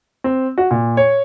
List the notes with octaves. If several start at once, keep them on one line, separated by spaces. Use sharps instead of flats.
C4
F#4
A#2
C#5